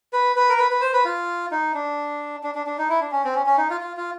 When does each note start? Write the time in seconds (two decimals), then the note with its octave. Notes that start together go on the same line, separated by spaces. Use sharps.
0.13 B4
0.36 B4
0.49 A#4
0.58 B4
0.71 B4
0.81 C5
0.93 B4
1.05 F4
1.51 D#4
1.74 D4
2.44 D4
2.55 D4
2.66 D4
2.78 D#4
2.89 E4
3.01 D4
3.12 C#4
3.24 C4
3.35 C#4
3.46 C#4
3.58 D#4
3.70 F4
3.81 F4
3.97 F4